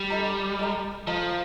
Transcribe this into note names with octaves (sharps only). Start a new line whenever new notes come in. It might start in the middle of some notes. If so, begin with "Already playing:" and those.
Already playing: G3
D4 A4 D#5 A#5
A4 D#5 A#5
F3 A4 D#5 A#5